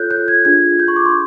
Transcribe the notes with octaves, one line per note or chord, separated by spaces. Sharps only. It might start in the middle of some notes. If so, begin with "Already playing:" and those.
Already playing: F4 A4 C#5 F#6 G6
G6
G#6
D4 F4 G#4 G#6
G6
C#6
D6
C6